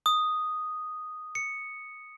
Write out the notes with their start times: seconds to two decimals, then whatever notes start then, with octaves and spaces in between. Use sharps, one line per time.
0.06 D#6
1.35 C#7